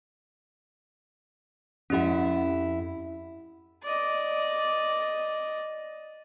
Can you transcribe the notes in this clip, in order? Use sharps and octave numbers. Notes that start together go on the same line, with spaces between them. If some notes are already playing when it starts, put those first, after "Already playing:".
F2 C#4 E4 G4 F#5
D5 D#5